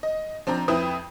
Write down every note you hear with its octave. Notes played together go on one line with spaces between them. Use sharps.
D#5
F3 C4 D4 A#5
F2 C4 E4 B4 D#6